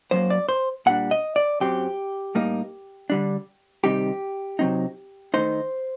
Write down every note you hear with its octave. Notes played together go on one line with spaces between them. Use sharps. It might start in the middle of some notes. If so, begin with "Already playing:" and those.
F#2 F#3 A#3 C5
D5
C5
A#2 G3 D4 F#5
D#5
D5
F#2 F#3 C4 G4
A2 G3 A#3 D#4
D3 G3 D4
C3 D#3 G3 C4 D#4 G4
C3 F#3 C4 D#4
D#3 A3 D#4 C5